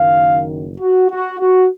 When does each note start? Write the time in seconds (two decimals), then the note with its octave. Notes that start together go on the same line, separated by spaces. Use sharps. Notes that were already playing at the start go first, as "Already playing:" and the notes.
Already playing: F#1 F#2 D#3 F5
0.78 F#4
1.10 F#4
1.40 F#4